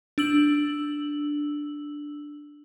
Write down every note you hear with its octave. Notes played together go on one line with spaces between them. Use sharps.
D4 E6 F#7